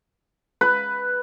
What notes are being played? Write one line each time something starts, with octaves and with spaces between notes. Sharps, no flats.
B4